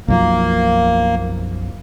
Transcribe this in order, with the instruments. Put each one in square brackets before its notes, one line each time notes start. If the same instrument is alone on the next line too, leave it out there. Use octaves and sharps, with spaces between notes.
[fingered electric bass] B1 F#2 F3 [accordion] A#3